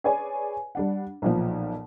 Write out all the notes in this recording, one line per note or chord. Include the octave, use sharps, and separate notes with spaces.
G#4 B4 C#5 D5 G#5
G3 D4 F#5
B1 A#2 F3